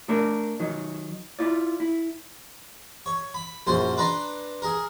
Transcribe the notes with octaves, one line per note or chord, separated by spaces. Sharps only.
A3 D4 A#4
D#3 F#3
E4 F4 D5
E4
C#5
B5
A#1 F#2 C5 C6
D4 B4 A#5 C6
G#4 A#4